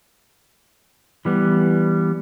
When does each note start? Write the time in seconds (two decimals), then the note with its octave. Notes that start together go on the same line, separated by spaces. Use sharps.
1.25 E3 G3 B3